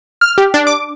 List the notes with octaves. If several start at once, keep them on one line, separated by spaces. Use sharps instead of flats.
F6
G4
D4
D6